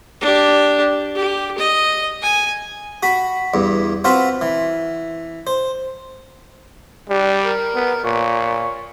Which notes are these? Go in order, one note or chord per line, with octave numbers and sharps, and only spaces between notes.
D4 G4
G4
D#5
G#5
F#4 B5
E2 G2
C4 F4 F#4 B4
E3
C5
G3 D4
A#4
B3
A#2 C#5